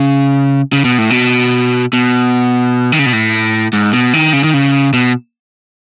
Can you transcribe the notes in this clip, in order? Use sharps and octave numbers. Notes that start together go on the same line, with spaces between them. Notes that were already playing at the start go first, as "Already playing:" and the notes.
Already playing: C#3
C#3
B2
A2
B2
B2
D#3
C#3
B2
A2
G#2
B2
D#3
C#3
D#3
C#3
B2